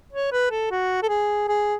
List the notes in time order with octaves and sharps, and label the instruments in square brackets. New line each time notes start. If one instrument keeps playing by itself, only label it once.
[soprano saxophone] C#5
B4
A4
F#4
A4
G#4
G#4